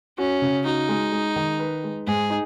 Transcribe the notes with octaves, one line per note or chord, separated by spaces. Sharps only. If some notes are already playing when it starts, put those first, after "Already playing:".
C#4 F#4
C#3
D#4 F#4
G#3
G#3
D#3
B4
G#3
G#2 G#4
D#4